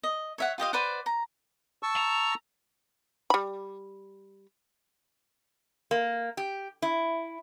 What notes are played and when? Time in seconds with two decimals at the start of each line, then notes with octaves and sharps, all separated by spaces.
0.03 D#5
0.38 C#5 E5 F#5
0.58 F4 G4 D#5 F5
0.73 B4 C5 D5 F#5
1.06 A#5
1.83 A5 C#6 E6
1.97 A#5
3.30 G3 B5
5.91 A#3
6.37 G4
6.82 E4